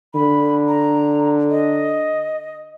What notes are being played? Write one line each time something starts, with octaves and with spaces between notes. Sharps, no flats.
D3 B5
A#5
D#5